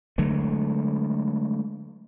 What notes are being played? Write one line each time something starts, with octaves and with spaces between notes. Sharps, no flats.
D3 F#3 G#3 A3